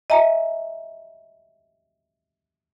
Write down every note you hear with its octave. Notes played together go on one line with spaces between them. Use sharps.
D#5 E5 G#5 A#5